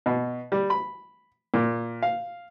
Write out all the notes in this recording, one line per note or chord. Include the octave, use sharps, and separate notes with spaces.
B2
G3
B5
A#2
F5